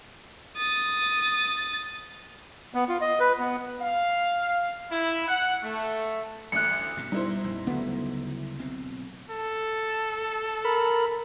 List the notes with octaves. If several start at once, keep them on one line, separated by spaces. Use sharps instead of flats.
D#6 A6
B3
F4
D#5
B4
B3
F5
E4
F#5
A3
A1 D2 F#6 C#7
G2 B2
G3 D#4 E4 C5
A#1 F2
D2 C#3 F#3 G3 B3
B1 B2 C4
A4
A#4 B5